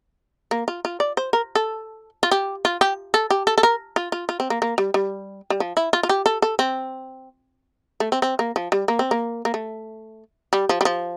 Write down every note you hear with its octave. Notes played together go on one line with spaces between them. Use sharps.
A#3
F4
F4
D5
C5
A#4
A4
F4
G4
F4
G4
A4
G4
A4
A4
A#4
F4
F4
F4
C4
A#3
A#3
G3
G3
G3
F3
E4
F4
F4
G4
A4
A4
C4
A3
C4
C4
A#3
F3
G3
A#3
C4
A#3
A#3
A3
G3
F3
G3
F3